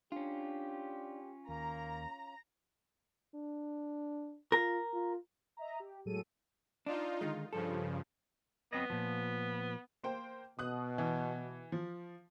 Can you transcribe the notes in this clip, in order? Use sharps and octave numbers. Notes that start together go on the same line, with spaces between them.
C#4 D4 F4 G4
D#2 A#3 A#5
D4
F4 A#4
F4
D#5 E5 A#5
G4
A2 F#3 G#3 G#4 A4 D#7
D4 D#4 F4
D3 D#3 G#3
G2 C#3 F3 A4
F#3 B3 C4 D#5
A#2 F3
A#3 C5 G5
B2 D#6 F#6
E3
F3